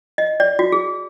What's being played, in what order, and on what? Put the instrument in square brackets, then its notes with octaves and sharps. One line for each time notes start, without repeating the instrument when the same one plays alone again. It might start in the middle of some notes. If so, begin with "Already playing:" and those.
[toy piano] D#5
D5
F#4
G#4